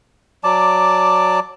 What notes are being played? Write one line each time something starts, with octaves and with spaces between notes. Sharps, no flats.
F#3 D5 A5 D6